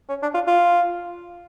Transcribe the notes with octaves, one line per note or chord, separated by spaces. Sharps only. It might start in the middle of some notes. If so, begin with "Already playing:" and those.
C#4
D4
F4
F4